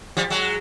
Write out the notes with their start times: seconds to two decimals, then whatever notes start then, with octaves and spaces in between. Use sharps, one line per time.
0.17 F3 G3
0.30 F#3 G#3